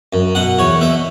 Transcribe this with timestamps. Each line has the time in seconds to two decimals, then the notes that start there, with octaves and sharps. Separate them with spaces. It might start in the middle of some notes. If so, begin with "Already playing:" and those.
0.13 F#2
0.35 B2 F#5
0.59 E2 C#5
0.81 B2 E5